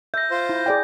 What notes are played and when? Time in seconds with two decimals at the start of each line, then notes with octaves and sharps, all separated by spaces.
0.14 E5 G6 A#6
0.31 F4 C5
0.49 E4
0.66 G#4 D5 G5